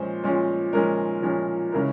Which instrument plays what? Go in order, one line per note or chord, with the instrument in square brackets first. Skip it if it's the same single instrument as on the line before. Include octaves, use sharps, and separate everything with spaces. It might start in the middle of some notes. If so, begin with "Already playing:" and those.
Already playing: [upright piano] A#2 F3 G#3 C#4 C5
A#2 F3 G#3 C#4
A#2 F3 G#3 C#4 A#4
A#2 F3 G#3 C#4
C#3 E3 G#3 C#4 A#4